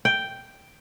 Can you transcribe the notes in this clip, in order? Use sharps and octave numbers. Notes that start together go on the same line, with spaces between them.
G5